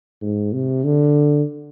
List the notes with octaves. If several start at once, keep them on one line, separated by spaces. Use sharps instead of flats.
G#2
C3
D3